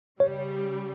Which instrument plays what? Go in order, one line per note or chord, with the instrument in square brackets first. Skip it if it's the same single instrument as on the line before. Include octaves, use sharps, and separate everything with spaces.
[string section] C#3 G3 [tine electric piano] C#5